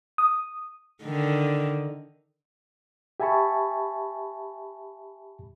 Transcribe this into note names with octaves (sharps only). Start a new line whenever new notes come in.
D#6
D3 D#3
G4 E5 G#5 A5 B5 C#6